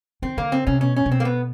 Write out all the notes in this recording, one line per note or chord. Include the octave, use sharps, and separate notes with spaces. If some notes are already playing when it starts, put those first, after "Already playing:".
D#3 C4
D3 A#3
C#3 C4
C3 C#4
B2 C#4
C#4
C3
B2 C4
A#3
B3